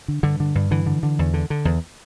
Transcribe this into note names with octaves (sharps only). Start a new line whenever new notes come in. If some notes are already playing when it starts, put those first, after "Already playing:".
D3
G2 D3
D3
G2
D3 E3
D3
D3
E2
D3
D3
E2